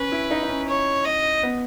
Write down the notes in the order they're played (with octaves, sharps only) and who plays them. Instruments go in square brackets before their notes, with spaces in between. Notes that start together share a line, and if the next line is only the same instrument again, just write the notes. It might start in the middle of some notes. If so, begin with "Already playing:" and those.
Already playing: [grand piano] C#4 [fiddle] B4
[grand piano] E4
D#4
D#4
C#4
[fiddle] C#5
D#5
[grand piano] B3